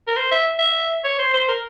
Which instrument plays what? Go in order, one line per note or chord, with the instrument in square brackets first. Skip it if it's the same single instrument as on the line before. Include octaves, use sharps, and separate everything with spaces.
[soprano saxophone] A#4
C5
E5
E5
C#5
C5
C5
A#4